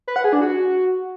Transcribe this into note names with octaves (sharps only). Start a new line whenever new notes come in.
B4
F#5
G#4
D4
F#4